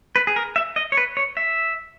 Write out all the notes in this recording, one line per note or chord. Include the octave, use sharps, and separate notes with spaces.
B4
G#4
A#4
E5
D#5
C#5
B4
C#5
E5